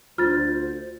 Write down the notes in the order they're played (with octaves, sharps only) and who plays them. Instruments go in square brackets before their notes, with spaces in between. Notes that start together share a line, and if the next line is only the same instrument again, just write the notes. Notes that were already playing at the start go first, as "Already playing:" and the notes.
[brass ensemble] D2 [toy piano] F4 [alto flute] C5 [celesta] F6 A6